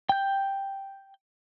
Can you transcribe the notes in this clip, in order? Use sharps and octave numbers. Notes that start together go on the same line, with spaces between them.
G5 G6